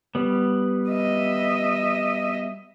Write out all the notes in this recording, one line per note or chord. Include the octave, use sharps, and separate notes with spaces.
G3 B3
D#5 E5